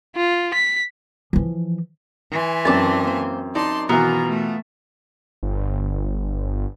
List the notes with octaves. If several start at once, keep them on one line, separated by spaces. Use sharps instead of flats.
F4
B6
E3 F3
E3 G#5 C6
F#2 C4 D5 A5
A#3 C5
D#4 D5 A5 C6
B2 D#3 E3 B3 F4 A#4 A#5
A3
G1